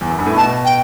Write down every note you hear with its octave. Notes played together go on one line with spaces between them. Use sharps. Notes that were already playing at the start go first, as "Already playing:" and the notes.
E2
F#2
G2
A2
B2 A5
G5